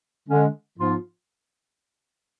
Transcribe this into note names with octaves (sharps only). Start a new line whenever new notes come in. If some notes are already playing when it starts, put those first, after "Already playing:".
D3 G#3 C#4
G#2 F3 B3 F4